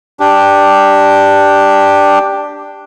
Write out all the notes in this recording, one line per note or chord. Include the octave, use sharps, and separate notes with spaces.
D4 G4